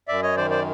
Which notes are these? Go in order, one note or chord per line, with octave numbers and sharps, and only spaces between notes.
F#2 D5 E5
C#5 D#5
D#3 C5 D5
C5 D5